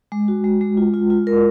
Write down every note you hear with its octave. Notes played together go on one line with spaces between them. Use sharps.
G#3
F#4
G#3
G#3
F4
F4
F4
A#4